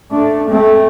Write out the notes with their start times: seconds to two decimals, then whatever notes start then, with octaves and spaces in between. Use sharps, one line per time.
0.12 A3 D4
0.50 A3 C4